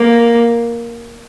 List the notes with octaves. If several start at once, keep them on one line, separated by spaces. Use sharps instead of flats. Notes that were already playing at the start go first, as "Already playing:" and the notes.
Already playing: A#3